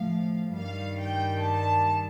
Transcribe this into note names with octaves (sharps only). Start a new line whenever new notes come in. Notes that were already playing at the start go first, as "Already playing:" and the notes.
Already playing: A2 F3 F5
G2 D#3 G3 F5
G5
A5